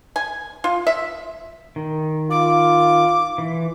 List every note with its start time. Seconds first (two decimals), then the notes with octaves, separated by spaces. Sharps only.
0.16 G#5
0.64 F4
0.87 E5
1.76 D#3
2.30 F4 D6
3.38 E3